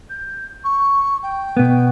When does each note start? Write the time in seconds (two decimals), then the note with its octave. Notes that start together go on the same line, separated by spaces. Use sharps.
0.10 G6
0.64 C#6
1.23 G5
1.57 B2 B3